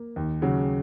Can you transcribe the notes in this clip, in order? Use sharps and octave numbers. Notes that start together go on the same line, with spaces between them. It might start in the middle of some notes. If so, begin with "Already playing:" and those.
Already playing: A#3
D#2
C#3 F#3